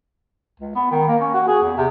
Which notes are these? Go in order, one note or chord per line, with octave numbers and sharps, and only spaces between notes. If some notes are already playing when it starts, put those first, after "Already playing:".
C#2
B3
D#3
A#3
C#4
F#4
G#4
E2
C3